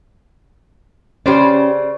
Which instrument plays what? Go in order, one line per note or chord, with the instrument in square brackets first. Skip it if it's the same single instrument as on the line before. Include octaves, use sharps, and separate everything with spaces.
[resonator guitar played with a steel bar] C#3 C5 D5 [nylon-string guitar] C#4 G4